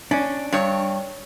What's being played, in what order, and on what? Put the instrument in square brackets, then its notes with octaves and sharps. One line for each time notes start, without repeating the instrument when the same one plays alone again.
[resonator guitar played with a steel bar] C#4 [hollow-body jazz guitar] D4
[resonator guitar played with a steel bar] G2 C#5